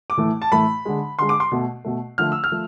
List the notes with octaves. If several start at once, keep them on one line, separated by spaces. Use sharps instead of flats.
D6
A2 E3 A3
A5
A2 E3 A3 B5
D3 G#3
D3 G#3 C6
D6
C6
B2 A3
B2 A3
D3 F3 A3 F6
E6
F6
F3 A3